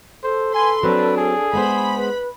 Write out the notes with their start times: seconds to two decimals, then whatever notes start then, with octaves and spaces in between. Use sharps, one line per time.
0.24 A4 C5
0.54 B4 G#5 C6
0.83 F#3 C4 D4 B4
1.17 G#4
1.53 G#3 B3 C5 B5
1.96 B4